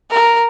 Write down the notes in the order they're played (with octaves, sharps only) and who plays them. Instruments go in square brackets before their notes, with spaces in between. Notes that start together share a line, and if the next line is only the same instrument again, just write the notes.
[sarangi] A#4